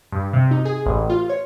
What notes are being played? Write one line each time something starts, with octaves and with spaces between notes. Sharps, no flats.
G2
C3
D#4
G#4
A1
F4
C#5